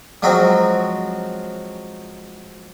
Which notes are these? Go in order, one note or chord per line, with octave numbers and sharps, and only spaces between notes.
F3 F#3 G#3 C4